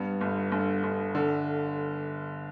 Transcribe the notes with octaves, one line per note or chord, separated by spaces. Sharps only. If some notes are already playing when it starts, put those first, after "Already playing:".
Already playing: G2 B3
G1
G1
G1
D3